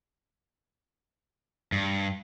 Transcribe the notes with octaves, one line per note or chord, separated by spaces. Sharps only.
G2